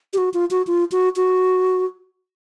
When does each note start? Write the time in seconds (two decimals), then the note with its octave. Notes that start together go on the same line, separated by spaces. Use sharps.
0.13 G4
0.18 F#4
0.34 F4
0.51 F#4
0.67 F4
0.92 F#4
1.16 F#4